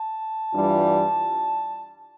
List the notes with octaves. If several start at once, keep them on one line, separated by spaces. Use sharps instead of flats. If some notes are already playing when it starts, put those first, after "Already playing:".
Already playing: A5
G2 E3 G3 D4 F4